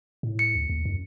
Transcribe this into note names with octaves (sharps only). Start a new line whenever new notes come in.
A2
C#7
D2
D#2
F#2